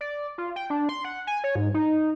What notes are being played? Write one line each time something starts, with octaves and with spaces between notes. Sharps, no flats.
D5
F4
G5
D4
C6
F#5
G#5
C#5
G#2
D#4